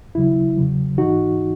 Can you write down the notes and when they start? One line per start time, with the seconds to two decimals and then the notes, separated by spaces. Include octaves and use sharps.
0.15 D#2 C#3 F#3 E4
0.57 E2 C#3 F#3
0.98 G#2 E3 D#4 F#4